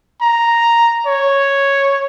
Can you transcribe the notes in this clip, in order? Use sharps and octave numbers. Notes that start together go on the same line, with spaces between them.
A#5
C#5